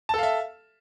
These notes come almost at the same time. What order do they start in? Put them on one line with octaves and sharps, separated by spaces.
A5 A4 F5 E5